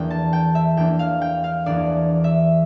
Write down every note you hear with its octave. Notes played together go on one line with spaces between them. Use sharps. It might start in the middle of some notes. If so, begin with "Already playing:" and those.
Already playing: E2 E3 A#3 D4 G5
A5
G5
E5
E2 E3 A#3 D4 G5
F5
G5
F5
E2 E3 A#3 D4 D5
E5